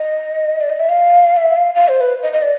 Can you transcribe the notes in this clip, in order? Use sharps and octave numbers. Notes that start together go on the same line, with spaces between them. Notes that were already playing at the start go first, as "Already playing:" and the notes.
Already playing: D#5
D5
D#5
E5
F5
E5
F5
F5
C5
B4
D#5
D#5
D5